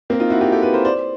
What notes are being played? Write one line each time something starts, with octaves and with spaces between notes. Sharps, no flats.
A#3 C4
D#4 F4
E4 F#4
F4 G4
G4 A4
A4 B4
A#4 C5
C5 D5